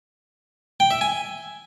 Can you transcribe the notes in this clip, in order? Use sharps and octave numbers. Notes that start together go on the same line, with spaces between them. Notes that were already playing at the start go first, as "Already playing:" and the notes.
G5
E5
G#5